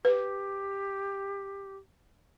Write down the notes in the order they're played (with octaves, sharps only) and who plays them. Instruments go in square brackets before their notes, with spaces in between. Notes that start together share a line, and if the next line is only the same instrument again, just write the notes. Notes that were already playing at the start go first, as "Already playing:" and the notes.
[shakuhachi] G4 [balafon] B4